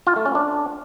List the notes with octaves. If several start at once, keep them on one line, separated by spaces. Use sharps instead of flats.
F4
A3
C#4
D4